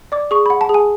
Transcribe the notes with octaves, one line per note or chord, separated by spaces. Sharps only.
D5 D6
G#4 C#6
F#5 B5
A5
G#4
G#5